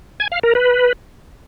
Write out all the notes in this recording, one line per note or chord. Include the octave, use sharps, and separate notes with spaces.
G#5
F5
A#4
B4